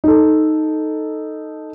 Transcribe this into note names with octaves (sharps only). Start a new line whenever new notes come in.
D#4 A4